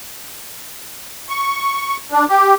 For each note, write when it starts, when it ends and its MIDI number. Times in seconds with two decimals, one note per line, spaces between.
1.29 1.97 85
2.12 2.25 62
2.29 2.55 67